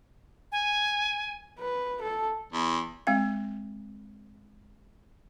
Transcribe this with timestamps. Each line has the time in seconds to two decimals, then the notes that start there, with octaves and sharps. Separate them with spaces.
0.52 G#5
1.59 B4
2.02 A4
2.53 E2
3.07 G#3 C4 F5